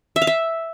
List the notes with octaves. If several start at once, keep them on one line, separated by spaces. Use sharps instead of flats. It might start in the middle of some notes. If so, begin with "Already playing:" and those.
E5
F5
E5